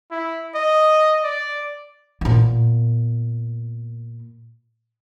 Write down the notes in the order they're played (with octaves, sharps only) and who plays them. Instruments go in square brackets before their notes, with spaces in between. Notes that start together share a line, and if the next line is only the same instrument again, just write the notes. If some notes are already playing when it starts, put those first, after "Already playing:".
[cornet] E4
D#5
D5
[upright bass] A#2 B3